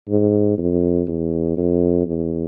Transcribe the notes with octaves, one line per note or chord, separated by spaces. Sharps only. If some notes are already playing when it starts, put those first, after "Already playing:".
G#2
F2
E2
F2
E2